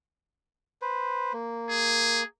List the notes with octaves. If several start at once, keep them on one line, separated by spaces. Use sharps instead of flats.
B4 C5
A#3
G#4